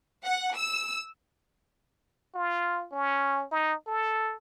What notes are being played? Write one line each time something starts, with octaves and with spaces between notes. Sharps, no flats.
F#5
E6
F4
C#4
D#4
A4